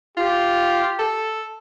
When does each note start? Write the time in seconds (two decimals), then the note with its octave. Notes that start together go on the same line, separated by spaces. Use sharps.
0.17 F4 G4
0.99 A4